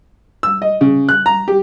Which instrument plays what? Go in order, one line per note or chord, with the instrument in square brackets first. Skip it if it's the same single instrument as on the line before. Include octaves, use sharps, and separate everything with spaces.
[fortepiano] E6
D#5
C#3
F#6
A#5
G4